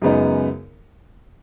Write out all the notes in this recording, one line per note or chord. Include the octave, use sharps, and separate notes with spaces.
F#2 C#3 G#3 B3 D#4